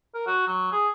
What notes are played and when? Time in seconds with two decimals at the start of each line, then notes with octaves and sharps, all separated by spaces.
0.14 A#4
0.27 F#4
0.47 F#3
0.72 G#4